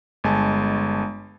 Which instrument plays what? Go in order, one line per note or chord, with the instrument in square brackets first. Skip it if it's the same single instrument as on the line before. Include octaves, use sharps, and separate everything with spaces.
[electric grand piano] G1 G#3 G#5 A5